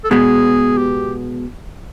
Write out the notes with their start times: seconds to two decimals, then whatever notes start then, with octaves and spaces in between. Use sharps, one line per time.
0.04 A4
0.10 B2 G#3 B3 G#4
0.77 G4